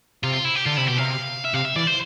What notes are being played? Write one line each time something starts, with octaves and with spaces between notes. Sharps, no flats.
C3 F4
F4
E4
G4
D3 F4
C3 E4
B2 G4
C3 F5
E5
C3 F5
E5
E3 D5
C5